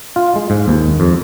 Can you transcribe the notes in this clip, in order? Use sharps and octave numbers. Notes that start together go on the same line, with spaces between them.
F4
G#3
G#2
D#2
F2